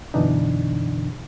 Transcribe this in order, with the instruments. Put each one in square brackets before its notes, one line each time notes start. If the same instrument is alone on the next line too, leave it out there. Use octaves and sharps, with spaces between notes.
[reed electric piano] F#2 B2 D3 E3 D4 D#4